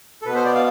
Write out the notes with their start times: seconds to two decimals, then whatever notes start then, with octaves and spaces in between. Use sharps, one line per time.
0.22 A4
0.26 B2 B3 B4
0.35 C5
0.45 D5
0.55 F5